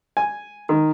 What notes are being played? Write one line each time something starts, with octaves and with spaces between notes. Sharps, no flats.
G#5
D#3